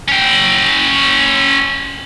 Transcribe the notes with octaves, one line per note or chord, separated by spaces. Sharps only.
C#4 G5